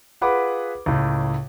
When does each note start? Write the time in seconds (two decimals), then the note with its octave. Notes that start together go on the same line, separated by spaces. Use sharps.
0.21 F4 G#4 B4 F#5 B5 D6
0.86 C#2 A2